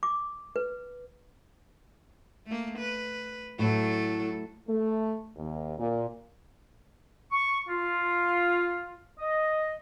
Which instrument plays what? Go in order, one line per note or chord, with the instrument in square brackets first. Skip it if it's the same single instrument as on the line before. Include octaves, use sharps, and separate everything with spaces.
[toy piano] D6
B4
[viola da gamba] A3 A#3
B4
[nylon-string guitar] A2 [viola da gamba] F#3 A3 A4
[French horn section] A3
D#2
A#2
[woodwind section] C#6
F4
D#5